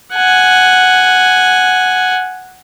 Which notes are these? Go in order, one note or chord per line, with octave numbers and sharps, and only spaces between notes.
F#5 G#5